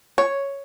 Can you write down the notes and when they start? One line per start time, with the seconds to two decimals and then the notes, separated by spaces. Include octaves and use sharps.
0.18 C#5